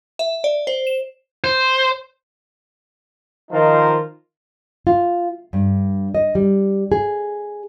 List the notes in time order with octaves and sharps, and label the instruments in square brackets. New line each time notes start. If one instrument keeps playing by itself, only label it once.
[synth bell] E5
D5
C5
E7
[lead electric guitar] C5
[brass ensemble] D#3 F3 D#4 F4 A#4 C5
[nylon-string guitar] F4
G2
D#5
G3
G#4